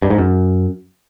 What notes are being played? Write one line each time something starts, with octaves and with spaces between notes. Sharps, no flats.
G2
G#2
F#2